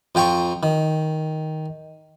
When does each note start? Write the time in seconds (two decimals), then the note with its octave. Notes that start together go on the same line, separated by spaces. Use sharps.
0.15 F2 F4 G5 A#5 C#6
0.63 D#3